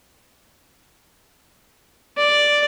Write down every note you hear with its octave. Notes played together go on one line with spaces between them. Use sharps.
D5